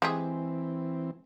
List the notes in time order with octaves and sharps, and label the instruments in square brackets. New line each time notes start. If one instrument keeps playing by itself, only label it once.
[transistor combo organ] E3 C4 [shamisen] G#3 G4 G#4